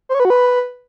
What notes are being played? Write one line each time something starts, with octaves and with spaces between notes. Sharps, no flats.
C5
C#5
B4
F#4
B4